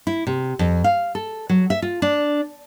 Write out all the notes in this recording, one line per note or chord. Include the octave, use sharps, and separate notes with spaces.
E4
C3
F2
F5
A4
F#3
E5
F4
D4